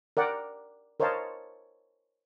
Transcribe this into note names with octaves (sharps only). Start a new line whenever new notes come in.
A#4 D5 F#5 G5
A#4 C5 C#5 D#5 F5 A5